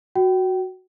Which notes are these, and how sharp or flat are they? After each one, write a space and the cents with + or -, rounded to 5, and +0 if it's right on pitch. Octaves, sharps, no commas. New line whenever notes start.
F#4 +0 G5 -30